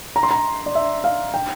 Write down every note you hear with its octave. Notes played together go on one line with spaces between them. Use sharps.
A#5
C6
A#5
D5
E5
F5
G5